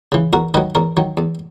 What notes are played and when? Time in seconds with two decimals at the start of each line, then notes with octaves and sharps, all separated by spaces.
0.12 C#3 E3
0.33 E2 F#4 A#4
0.54 D#3 F#3 B4 D#5
0.75 E2 A#4 C#5
0.97 D#3 F#3
1.17 E2